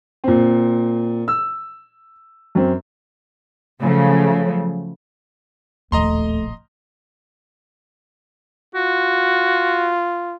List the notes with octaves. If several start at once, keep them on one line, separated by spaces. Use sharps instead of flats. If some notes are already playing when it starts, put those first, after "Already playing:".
A#2 C4
E6
F#2 C4
C#3 F3 F#3 A3
D1 A#1 D#2 A3 D#5 A#5 C6
F4 F#4